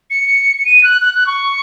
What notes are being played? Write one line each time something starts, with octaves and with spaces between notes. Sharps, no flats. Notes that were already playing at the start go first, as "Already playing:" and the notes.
C#7
C#7
D#7
F#6
F#6
F#6
C#6